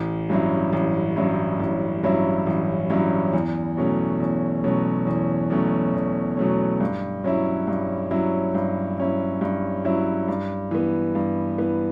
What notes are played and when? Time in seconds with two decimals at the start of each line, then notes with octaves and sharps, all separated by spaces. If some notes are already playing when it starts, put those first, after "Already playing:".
Already playing: A1
0.30 G2 F#3 C#4 E4
0.73 A1
1.16 G2 F#3 C#4 E4
1.60 A1
2.03 G2 F#3 C#4 E4
2.47 A1
2.90 G2 F#3 C#4 E4
3.33 E2
3.77 B2 F#3 A3 C#4
4.20 E2
4.64 B2 F#3 A3 C#4
5.07 E2
5.50 B2 F#3 A3 C#4
5.94 E2
6.37 B2 F#3 A3 C#4
6.80 G2
7.24 F#3 C#4 E4
7.67 G2
8.11 F#3 C#4 E4
8.54 G2
8.98 F#3 C#4 E4
9.41 G2
9.85 F#3 C#4 E4
10.28 G2
10.71 E3 B3
11.15 G2
11.58 E3 B3